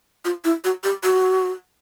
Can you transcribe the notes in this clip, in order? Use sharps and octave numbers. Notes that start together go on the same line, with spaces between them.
F4
E4
F#4
G4
F#4